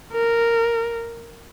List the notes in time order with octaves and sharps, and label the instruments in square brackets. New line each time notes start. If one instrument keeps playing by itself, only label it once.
[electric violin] A#4